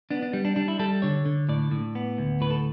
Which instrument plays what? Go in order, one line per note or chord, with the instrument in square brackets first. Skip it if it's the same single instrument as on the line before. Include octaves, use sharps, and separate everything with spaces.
[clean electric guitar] B3 D4
D4
G3
D4
G3 D4
E4
G3 A4
D3 C#5
D3
A2 D5
A2
B3
D2
A2 B4
A4